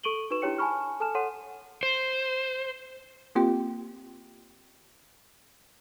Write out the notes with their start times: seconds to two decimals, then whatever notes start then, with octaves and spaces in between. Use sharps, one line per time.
0.03 A4 C#6 D7 D#7 F#7 G7
0.30 D#4 F#4 B4 C#6 E7
0.42 D4 E4 G4 C#5 G5 C#7
0.58 G#5 A5 B5 C#6 F6
1.00 A4 G#5 A5 F6 E7
1.15 A4 C#5 F#5 C6 D#7
1.83 C5
3.35 A#3 C4 F4 G4 G5